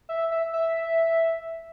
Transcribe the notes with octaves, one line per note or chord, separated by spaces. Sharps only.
E5
E5
E5